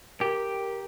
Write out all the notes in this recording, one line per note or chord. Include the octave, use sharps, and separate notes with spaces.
G4 A#4